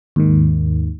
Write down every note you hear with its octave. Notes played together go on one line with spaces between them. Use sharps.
D#2 G#2 D#3